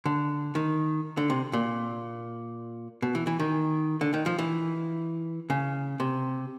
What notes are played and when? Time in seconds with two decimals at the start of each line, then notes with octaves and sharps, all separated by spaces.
0.06 D3
0.55 D#3
1.17 D3
1.30 C3
1.53 A#2
3.02 B2
3.15 E3
3.27 E3
3.40 D#3
4.01 D3
4.14 D#3
4.26 F3
4.39 E3
5.50 C#3
6.00 C3